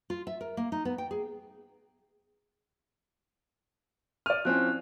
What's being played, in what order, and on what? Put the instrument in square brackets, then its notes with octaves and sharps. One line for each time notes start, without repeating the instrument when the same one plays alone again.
[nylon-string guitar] F4
E5
A#4
A#3
D#4
B3
G5
G#4
[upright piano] D5 F6 [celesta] D#7
[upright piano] F3 C4 C#4 [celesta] E4 F#6